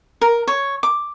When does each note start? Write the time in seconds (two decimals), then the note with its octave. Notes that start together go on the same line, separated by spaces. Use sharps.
0.21 A#4
0.47 C#5
0.83 D6